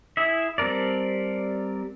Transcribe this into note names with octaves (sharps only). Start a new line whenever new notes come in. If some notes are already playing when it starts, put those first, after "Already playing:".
E4 G#4 E5
G3 C4 A4 A#4 D5